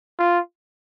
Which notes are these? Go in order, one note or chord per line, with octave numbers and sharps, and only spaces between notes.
F4